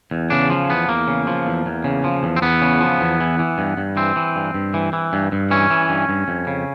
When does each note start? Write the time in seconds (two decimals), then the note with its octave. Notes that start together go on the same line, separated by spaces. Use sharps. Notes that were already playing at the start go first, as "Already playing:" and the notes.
0.11 E2
0.30 C#3 D4
0.50 F3
0.70 E2 B3
0.88 E2 A#3
1.08 C#3
1.27 F3
1.47 E2
1.66 E2
1.84 C#3
2.04 F3
2.23 E2
2.36 C4
2.42 E2 B3
2.61 C#3
2.81 F3
3.01 E2
3.20 E3
3.39 E3
3.58 G2
3.78 G2
3.97 E3 C4
4.16 E3
4.36 G2
4.54 G2
4.74 E3
4.93 E3
5.13 G2
5.32 G2
5.51 E3 C#4
5.70 E3
5.90 G2
6.09 G2
6.28 F2
6.47 C#3